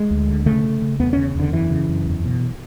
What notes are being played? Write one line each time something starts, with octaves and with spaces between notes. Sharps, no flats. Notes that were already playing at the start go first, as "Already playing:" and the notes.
Already playing: G#3
D2
D3
C#3 A3
C#3
C#3
E2 B3
C#3 C#4
E2 D3
F#2 E3
C#3
F#2
E2
B2